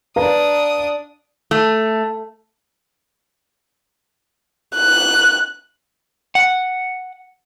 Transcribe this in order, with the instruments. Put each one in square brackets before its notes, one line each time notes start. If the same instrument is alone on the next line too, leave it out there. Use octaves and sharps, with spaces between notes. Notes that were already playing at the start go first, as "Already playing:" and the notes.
[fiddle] D4 D#6 [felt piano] B4 F5 A#5
[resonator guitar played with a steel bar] A3
[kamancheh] F#6
[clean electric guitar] F#5